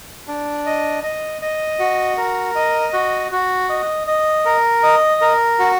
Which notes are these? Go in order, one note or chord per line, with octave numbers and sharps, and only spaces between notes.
D4
D#5
D#5
D#5
F#4
A#4
D#5
F#4
F#4
D#5
D#5
A#4
D#5
A#4
F#4